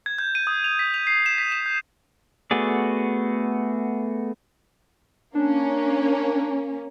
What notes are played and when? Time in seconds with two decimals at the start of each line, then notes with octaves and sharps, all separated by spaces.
0.06 G#6
0.18 G6
0.35 D#7
0.47 D#6
0.64 F7
0.79 B6
0.94 F7
1.07 C7
1.26 E7
1.38 B6
1.52 E7
1.66 G6
2.51 A3 B3 F#4 G#4 D5
5.35 A#3 C#4 D4